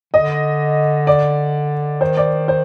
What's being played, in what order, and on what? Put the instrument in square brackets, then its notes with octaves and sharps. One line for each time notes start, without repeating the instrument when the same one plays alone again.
[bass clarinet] D3 [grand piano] D#5
[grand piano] D5
[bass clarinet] D#3 [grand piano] C5
[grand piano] D5
C5